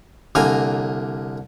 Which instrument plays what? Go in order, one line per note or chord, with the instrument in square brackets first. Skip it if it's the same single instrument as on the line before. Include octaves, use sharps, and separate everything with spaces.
[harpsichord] C2 D3 A#3 A#4 G#5